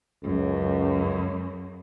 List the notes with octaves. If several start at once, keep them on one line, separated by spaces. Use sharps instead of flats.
C#2 F#2